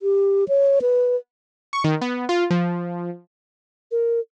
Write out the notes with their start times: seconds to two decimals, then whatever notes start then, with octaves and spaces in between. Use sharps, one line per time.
0.02 G4
0.48 C#5
0.82 B4
1.73 C#6
1.84 D#3
2.01 B3
2.29 F4
2.51 F3
3.91 A#4